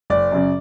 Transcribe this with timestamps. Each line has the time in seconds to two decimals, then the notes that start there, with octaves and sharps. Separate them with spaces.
0.10 F#1 D5
0.32 F#2 C#3